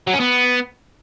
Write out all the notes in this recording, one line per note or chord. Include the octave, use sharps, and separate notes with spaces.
F#3
C#4
B3